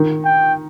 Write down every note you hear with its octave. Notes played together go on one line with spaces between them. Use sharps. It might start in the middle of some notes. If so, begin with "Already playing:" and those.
Already playing: D#3
G5